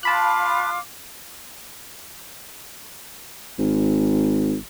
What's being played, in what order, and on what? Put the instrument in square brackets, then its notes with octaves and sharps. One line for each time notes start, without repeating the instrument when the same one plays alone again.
[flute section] F4 F5 D6 [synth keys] A5 B5 F#6
[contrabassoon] G#1